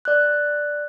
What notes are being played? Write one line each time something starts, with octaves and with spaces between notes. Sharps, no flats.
D5 F#6